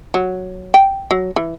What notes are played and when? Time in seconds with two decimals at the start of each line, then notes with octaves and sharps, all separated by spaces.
0.14 F#3
0.74 G5
1.11 F#3
1.36 E3